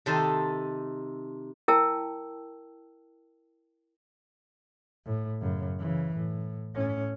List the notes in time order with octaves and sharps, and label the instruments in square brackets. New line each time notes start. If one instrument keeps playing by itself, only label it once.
[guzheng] C3 D#3 D#4 A4 A5 C6
[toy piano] E4 A#4 G5 A5 E6
[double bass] A2
F#2 C#3
C#3 E3
A2
A2 C#4